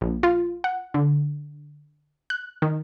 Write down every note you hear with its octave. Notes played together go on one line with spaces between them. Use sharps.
A#1
F4
F#5
D3
F#6
D#3